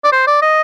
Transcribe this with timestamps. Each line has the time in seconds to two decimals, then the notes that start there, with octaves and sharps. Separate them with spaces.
0.04 D5
0.12 C5
0.27 D5
0.42 D#5